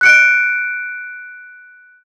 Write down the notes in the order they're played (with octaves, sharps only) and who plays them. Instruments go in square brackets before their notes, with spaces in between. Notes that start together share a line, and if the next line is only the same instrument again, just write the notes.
[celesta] F#6 C#7 D7